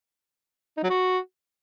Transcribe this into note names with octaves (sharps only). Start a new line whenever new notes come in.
D#4
F#3
F#4